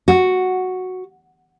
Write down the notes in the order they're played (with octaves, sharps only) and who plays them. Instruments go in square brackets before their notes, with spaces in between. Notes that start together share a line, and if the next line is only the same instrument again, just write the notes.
[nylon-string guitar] F#4